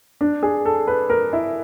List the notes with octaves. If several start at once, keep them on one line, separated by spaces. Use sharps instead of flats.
D4
G#4
A4
B4
A#4
E4